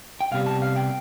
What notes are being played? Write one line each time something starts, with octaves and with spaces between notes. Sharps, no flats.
G5
C2 C3 G3 B3 F5
A5
F5
G5